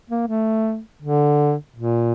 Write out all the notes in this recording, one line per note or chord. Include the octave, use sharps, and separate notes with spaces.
A#3
A3
D3
A#2